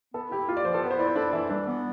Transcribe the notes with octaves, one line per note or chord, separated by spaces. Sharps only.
B3 A4
E4 G4
F4 G4
D5
F3 C5
A4
B3 B4
C5
E4 D5
C5
D4 A4
E3 E4
G3 D4
B3